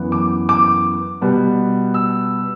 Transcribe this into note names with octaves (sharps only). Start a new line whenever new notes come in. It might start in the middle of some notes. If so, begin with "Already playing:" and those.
Already playing: F#2 E3 B3
D6
D6
B2 G3 B3
E6